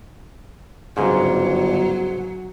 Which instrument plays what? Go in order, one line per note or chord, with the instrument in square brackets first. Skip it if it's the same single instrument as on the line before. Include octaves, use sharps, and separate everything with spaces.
[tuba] G1 [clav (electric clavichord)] G#2 C#3 [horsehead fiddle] F#3